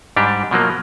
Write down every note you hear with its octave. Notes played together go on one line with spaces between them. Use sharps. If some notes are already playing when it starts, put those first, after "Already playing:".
G#2 G3 D4 G4
B2 F3 F#3 A#3